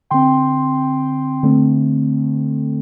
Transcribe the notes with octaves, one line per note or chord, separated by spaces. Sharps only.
D3 C4 G5 C6
D3 A3 C4